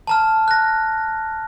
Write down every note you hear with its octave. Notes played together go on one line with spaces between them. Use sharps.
A5 A#5 F6
F#6 A#6